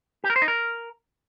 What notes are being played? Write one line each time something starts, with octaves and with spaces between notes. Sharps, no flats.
G4
A#4
C5
D#4
A#4